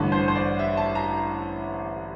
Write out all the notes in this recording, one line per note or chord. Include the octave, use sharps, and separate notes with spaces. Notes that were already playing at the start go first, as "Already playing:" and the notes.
Already playing: A1 G2 D3
C5
C5
D5
E5
A5
A#5